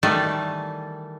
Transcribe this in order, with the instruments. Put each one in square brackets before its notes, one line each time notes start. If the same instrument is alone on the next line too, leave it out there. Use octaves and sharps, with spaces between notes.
[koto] D#3 E3 G3 A3